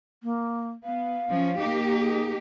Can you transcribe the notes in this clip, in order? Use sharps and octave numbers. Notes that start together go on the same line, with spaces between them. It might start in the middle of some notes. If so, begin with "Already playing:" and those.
A#3
B3 F5
F3 C#4
A#3 D#4 G4
G#4